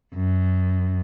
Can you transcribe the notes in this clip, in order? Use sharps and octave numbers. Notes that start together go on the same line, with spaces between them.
F#2